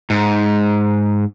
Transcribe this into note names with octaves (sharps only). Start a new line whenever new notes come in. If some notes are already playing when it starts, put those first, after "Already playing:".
G#2